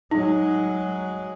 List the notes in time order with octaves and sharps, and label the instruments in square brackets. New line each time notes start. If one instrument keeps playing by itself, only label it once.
[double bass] F#3 G#3 [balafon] D#4